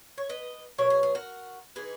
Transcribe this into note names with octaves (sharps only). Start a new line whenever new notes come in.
C#5
B4 D#5
B2 F#3 B3 A#4 C#5
G#4
G#4
F#4 A#4
E3 G#3 D#4 G#4 B4